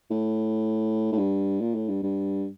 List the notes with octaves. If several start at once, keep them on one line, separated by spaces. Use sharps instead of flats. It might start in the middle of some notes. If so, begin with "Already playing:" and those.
A2
A2
G2
A#2
A2
G2
G2